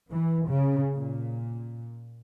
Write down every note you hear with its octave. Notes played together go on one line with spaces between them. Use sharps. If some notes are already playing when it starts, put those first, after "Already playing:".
E3
C#3
A#2